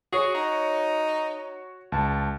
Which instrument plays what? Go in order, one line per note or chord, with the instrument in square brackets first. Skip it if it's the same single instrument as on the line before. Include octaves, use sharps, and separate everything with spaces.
[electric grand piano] F#4 C#5 C#6 [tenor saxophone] G#4
[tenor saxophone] D#4
[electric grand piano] C#2 A5